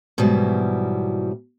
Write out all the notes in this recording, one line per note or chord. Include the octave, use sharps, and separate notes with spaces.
G#2 B2 E3 F#3 G3 E4